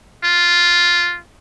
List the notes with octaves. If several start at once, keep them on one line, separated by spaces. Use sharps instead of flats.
F4